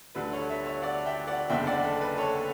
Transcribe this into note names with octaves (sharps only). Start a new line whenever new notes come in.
D2 D3 G3 B4
A4 C#5
C#5 E5
C#5 E5
D5 F#5
E5 G5
D5 F#5
F#1 E2 D3 E5 G5
D5 F#5
A4
B4
A4 C#5